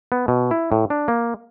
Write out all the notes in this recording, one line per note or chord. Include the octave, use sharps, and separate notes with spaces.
B3
B2
E4
A2
D4
A#3